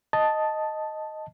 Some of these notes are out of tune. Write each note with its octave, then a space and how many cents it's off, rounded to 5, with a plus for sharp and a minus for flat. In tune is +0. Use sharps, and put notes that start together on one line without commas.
D#5 +0 A5 +0